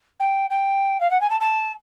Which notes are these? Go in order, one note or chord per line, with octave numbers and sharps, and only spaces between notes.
G5
G5
F5
F#5
G#5
A5
A5